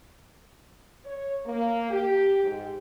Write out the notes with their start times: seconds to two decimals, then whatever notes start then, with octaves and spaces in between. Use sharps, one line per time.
1.05 C#5
1.46 A#3
1.90 G4
2.43 G#2